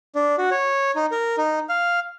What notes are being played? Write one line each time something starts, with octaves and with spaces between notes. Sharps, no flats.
D4
F#4
C#5
D#4
A#4
D#4
F5